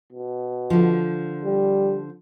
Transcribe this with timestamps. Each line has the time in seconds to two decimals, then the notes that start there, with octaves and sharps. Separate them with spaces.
0.12 B2
0.70 D3 F3
1.44 G3